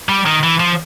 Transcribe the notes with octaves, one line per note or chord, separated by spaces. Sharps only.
G3
D#3
E3
F3